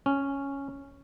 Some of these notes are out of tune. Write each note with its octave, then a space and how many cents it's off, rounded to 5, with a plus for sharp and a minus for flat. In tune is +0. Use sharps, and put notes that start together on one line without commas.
C#4 +0